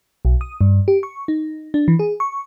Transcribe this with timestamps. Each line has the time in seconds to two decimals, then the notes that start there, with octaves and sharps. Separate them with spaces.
0.25 B1
0.41 D#6
0.61 G2
0.88 G4
1.03 C#6
1.28 D#4
1.74 D4
1.88 E3
1.99 G#4
2.20 C#6